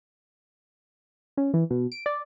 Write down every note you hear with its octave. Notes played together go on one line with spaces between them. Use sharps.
C#4
E3
B2
D7
D5